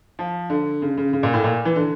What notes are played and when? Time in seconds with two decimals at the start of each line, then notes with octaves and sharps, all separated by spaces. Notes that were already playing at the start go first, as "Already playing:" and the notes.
0.19 F3
0.50 D3
0.82 C#3
0.97 C#3
1.13 C#3
1.23 A#2
1.33 A2
1.44 A#2
1.65 E3
1.76 D3